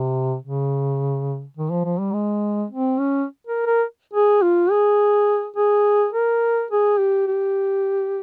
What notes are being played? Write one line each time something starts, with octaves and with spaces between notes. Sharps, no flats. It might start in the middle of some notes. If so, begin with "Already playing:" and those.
Already playing: C3
C#3
D#3
F3
F3
G3
G#3
C4
C#4
A#4
A#4
G#4
F4
G#4
G#4
A#4
G#4
G4
G4